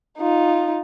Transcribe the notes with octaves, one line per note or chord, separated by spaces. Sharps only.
D#4 F4